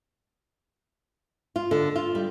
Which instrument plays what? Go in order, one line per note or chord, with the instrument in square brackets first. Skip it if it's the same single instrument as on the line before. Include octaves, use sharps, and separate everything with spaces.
[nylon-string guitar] F4
D3
F4
G3